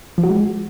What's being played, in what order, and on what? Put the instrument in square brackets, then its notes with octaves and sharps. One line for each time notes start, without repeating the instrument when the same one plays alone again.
[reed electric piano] F3
F#4
G#3